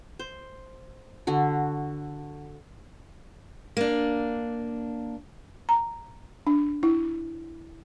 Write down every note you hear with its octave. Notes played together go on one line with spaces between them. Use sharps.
C5
D3 F#4
A#3 D4
A#5
D4
E4